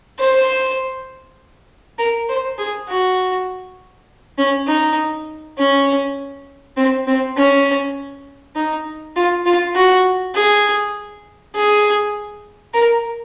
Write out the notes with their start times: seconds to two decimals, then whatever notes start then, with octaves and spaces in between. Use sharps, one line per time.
0.19 C5
1.98 A#4
2.28 C5
2.58 G#4
2.88 F#4
4.38 C#4
4.67 D#4
5.57 C#4
6.76 C4
7.07 C4
7.37 C#4
8.56 D#4
9.16 F4
9.46 F4
9.76 F#4
10.35 G#4
11.55 G#4
12.74 A#4